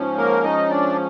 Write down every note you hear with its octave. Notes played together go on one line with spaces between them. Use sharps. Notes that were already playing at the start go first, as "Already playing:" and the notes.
Already playing: G#2 F3 C#4
A#3 A#4
D#4 D#5
D4 D5